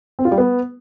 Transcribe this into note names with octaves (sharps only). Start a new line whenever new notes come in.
C4
F4
G3
B3